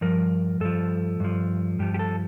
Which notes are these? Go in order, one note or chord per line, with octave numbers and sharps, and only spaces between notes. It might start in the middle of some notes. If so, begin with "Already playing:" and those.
G2 F3 A#4
G2 F3 A4
G2 F3
G2 F3 G4
G4
A4